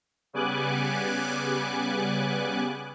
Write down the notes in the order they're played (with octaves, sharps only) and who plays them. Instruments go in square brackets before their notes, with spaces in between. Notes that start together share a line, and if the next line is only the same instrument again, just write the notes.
[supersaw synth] C#3 G3 B3 G#5 D6 F#6